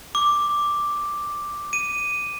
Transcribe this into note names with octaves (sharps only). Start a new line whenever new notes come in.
D6
D#7